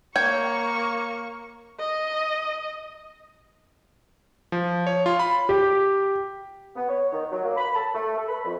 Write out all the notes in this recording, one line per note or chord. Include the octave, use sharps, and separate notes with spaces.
A#3 C#5 G5 C#6
D#5
F3
C#5
F4
B5
G4
B3
C#5
D#3
F#3
A#3
B5
A5
A3
A4
B5
F2